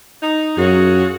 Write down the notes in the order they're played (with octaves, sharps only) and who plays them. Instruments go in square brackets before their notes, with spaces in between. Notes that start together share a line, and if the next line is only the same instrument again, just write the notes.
[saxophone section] D#4
[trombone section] F#2 [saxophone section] F4 F#4 G#4